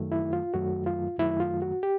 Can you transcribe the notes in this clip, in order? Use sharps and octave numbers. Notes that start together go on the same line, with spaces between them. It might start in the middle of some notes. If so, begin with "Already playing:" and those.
Already playing: F#2 D#3 F#3 A3
E4
F4
F#2 D#3 F#3 A3 F#4
F4
F#2 D#3 F#3 A3 E4
F4
F#4
G4